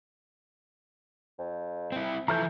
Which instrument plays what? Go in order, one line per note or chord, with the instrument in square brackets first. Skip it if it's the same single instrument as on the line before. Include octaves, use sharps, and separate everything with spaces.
[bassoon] F2
[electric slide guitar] C4 E4
[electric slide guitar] E3 F3 [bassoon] A3 [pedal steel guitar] A#5 F6 G6